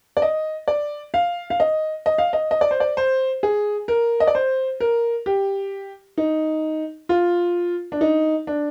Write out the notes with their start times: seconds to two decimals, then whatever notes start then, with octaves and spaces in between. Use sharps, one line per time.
0.17 D5
0.22 D#5
0.68 D5
1.14 F5
1.50 F5
1.60 D#5
2.06 D#5
2.18 F5
2.33 D#5
2.51 D#5
2.61 D5
2.71 C5
2.80 D5
2.97 C5
3.43 G#4
3.88 A#4
4.20 D#5
4.27 D5
4.35 C5
4.80 A#4
5.26 G4
6.18 D#4
7.09 F4
7.92 D4
8.01 D#4
8.47 D4